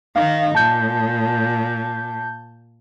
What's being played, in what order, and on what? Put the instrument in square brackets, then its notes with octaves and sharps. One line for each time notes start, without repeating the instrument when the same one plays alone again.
[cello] D#3 D#4 [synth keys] F5
[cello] A#2 [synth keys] A5 G6